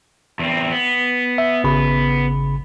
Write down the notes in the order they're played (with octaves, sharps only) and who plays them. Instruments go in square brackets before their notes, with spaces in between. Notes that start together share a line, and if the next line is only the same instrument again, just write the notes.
[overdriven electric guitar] E2 C4
B3
[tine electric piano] E5
G#1 C#3 B5